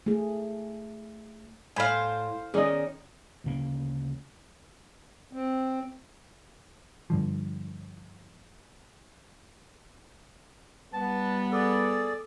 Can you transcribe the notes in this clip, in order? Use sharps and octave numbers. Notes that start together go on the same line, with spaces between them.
A3 G#4
A2 C5 F5 G#5 B5
D#3 C#4 G#4 D5 D#5
D2 C#3 A#3
C4
G2 D3 F3
G3 B3 A5
G#4 A4 D5